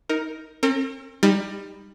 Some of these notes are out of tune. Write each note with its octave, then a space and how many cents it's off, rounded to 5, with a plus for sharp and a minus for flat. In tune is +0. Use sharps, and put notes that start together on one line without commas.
D#4 +20 A#4 +0
C4 +45 A#4 -35
G3 +20 D#4 +0